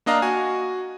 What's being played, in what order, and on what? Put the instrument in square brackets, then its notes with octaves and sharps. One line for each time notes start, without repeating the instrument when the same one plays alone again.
[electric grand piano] A#3 D4 D#5 F5 A#5
F#4 G#5